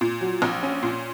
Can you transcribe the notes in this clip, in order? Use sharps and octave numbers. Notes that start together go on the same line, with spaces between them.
A#2
F#3
A#1
C#4
A#2